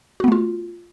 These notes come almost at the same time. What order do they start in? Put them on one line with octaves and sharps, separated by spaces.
F#4 B3 A3 F4